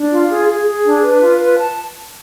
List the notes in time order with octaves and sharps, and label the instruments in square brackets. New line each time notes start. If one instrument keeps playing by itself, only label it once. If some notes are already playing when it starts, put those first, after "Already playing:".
Already playing: [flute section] D4
F4
G#4
G#4
G#4
D4
B4
F4
B4
A5